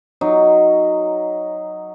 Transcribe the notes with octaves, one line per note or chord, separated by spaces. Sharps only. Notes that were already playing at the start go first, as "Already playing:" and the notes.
F#3 D#4